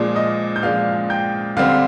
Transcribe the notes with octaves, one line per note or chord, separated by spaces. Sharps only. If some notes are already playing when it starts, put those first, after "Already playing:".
Already playing: A#2 F3 G#3 D4 D5
D#5 D#6
G6
A#2 F3 G#3 D4 F5 F6
G5 G6
D3 G3 C4 F5 F6